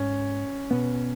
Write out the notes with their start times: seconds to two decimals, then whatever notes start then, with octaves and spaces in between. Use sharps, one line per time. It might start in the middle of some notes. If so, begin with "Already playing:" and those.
Already playing: G#2 C#4
0.71 B2 B3